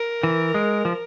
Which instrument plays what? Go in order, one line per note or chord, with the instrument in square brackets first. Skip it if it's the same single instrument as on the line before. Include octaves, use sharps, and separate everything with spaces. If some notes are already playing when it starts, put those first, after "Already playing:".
Already playing: [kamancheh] A#4
[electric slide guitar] E3
G#3
F3